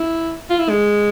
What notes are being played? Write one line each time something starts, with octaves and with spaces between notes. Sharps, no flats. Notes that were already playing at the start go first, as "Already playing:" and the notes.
Already playing: E4
F4
E4
G#3